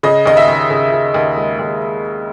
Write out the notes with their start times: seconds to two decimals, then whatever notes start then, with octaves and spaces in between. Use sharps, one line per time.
0.03 C#3 D#5
0.26 D#2 D#5
0.37 E5
0.48 D#2
0.70 C#3
0.92 C#3
1.14 D#2
1.37 G#3
1.59 D#2